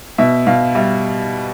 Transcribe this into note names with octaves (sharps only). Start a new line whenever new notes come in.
B2 E5
B2 F5
G3 E5